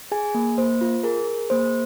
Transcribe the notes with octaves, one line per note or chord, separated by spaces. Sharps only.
G#4 G#5
A#3
A#3 C5
F4
G#4 A#4
G#4
A#3 C5